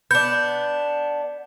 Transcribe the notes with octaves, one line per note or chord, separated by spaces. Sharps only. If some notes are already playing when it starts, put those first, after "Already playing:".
B3 D4 G6